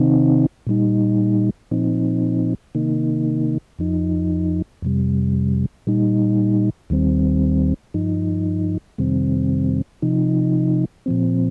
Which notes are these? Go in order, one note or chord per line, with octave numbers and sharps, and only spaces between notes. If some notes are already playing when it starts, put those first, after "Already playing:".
Already playing: C3 D#3 C4 D#4
A#2 G3 D#4
A#2 F3 C4 D#4
C3 D#3 A#3 D#4
F2 F3 D#4
F2 C3 G3
A#2 G3 D#4
D#2 D#3 G3 C4
G2 F3 D#4
F2 C3 D#3 G3 C4
C3 F3 D#4
A#2 F3 C4